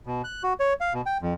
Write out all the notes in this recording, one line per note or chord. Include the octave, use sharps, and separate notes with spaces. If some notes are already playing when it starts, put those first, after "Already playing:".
B2
F#6
F#4
C#5
F5
B2
G5
F2